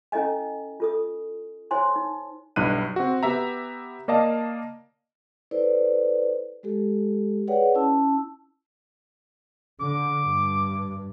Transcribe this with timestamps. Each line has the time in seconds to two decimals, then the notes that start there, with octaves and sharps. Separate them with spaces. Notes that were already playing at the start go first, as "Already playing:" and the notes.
0.12 C#4 E4 A4 D#5 G#5
0.80 F4 A4 D#6
1.71 E4 C5 C#5 G#5 C6
1.96 D#4
2.56 B1 G2 E4 F#6 D#7
2.96 C4 F#4
3.23 B3 G4 E5 A#5
4.08 A#3 D5 D#5 F5 A5
5.51 E4 A4 B4 C5 D5
6.63 G#3 G4 A4
7.48 G#4 B4 C#5 D5 F#5 G5
7.75 C#4 E4 A5 E6
9.80 D3 D6
10.25 G2